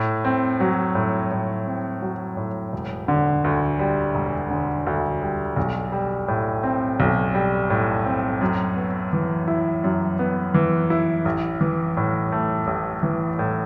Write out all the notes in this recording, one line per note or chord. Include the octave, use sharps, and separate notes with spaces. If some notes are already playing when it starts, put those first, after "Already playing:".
Already playing: A2
C4
F#3
A2
A2
C4
F#3
A2
E1
D3
D2
G3
E1
D3
D2
G3
B1
G3
A2
C4
B1
G3
A2
C4
F#2
B3
E3
E4
F#2
B3
E3
E4
A1
E3
A2
A3
A1
E3
A2